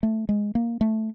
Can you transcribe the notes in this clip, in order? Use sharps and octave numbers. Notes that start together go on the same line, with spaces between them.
A3
G#3
A#3
A3